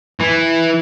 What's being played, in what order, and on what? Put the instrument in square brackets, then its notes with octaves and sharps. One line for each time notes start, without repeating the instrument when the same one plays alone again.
[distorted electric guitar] E3